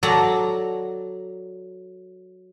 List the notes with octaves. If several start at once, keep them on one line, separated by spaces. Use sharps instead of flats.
F#3 A4 D5 A#5